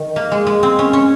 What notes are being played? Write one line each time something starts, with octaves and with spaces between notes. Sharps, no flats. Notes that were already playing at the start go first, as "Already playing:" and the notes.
Already playing: D#3
A#3
G#3
G#3
C4
C#4
C#4